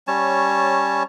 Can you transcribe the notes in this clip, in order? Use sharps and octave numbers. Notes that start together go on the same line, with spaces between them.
G3 C#4 C#5 A5